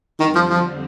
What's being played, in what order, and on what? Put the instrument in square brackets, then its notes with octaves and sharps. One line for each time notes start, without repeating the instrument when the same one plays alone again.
[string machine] F2 D3 G3 C4 [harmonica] D#3
[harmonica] F3
F3